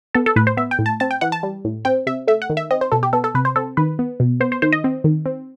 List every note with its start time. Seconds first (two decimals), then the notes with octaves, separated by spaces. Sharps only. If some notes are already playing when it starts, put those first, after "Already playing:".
0.14 B3 A4
0.26 A4
0.36 A2 B4
0.47 C5
0.57 B3 E5
0.71 G5
0.79 A2
0.86 A5
1.00 C4 A5
1.11 G5
1.21 E3 F#5
1.32 A5
1.43 G3
1.65 A2
1.85 C4 G5
2.07 C3 E5
2.27 A3 E5
2.42 F#5
2.50 D#3
2.57 E5
2.71 C4 D#5
2.81 C5
2.92 B2 A4
3.03 G4
3.13 B3 A4
3.24 A4
3.35 C3 B4
3.45 C5
3.56 C4 A4
3.77 D#3 B4
3.99 B3
4.20 B2
4.40 B3 C5
4.52 C5
4.62 D#3 C5
4.72 D#5
4.84 C4
5.04 D#3
5.26 C4